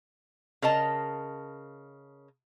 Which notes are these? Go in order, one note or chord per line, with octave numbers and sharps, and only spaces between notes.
C#3 A#4 D#5 A5